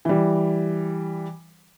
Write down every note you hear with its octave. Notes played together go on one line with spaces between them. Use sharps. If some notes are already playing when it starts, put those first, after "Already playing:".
E3 G3